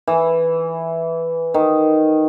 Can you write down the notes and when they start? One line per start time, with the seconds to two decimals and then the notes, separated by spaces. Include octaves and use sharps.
0.08 E3
1.54 D#3